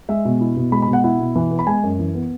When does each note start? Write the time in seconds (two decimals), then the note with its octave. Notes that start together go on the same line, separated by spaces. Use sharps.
0.09 G#3 E5
0.25 B2
0.41 E4
0.56 B2
0.72 G#3 B5
0.82 B5
0.88 B2
0.93 F#5
1.04 E4 F#5
1.19 B2
1.35 E3
1.51 B3
1.59 B5
1.67 G#3 G#5
1.83 F#2
1.99 E3
2.15 B3